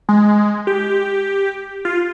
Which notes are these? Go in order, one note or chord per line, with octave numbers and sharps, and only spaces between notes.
G#3
G4
F4